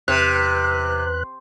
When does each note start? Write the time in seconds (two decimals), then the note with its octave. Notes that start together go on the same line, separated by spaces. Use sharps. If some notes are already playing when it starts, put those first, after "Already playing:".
0.08 E2 C3 B4 F#6